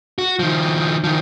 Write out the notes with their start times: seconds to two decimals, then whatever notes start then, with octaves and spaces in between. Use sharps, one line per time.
0.18 F#4
0.39 D#3 F3
1.04 D#3 F3